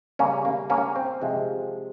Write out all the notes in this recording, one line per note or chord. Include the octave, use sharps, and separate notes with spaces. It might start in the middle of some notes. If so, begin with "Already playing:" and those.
C#3 G3 A#3 C#4
A#3
A#3 C#4
C4
C3 F3 G#3